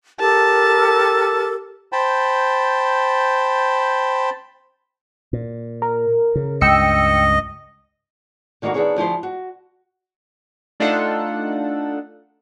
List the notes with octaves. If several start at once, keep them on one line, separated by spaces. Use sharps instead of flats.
G4 A4 A#4 A5
C5 G5 A5 B5
A#2
A#4
C#3
C#2 G2 D#5 G5 E6 C#7
D3 D#3 A#3 E4 F#4
D#3 B3 D4 E4 G#4 C#5
D2 F3 E4 C5
F#4
A3 D4 D#4 F4 A4 F#5